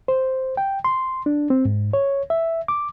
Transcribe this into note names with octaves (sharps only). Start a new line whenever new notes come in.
C5
G5
C6
D4
C4
G#2
C#5
E5
D6